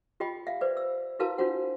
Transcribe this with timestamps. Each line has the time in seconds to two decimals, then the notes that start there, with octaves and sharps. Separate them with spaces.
0.20 F4 G4 D#5 G5 B5
0.47 E5 F5
0.61 B4 C5 D5
0.77 E6
1.19 E4 F#4 A#4 B4 F5 A5
1.38 D4 F4 F#4 C5 F#5